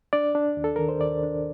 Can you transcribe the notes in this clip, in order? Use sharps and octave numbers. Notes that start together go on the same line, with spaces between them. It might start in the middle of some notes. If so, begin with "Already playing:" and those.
D4 D5
D4
D#2
A4
D#3 A#4
C5
D#2 D5
D4